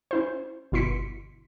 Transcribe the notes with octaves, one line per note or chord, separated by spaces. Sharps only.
C#4 E4 C5
G1 B2 E4 C6 B6 C#7